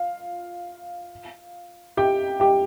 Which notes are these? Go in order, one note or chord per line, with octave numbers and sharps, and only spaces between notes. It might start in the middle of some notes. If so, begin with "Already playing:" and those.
Already playing: F4 F5
G4 G5
G4 G5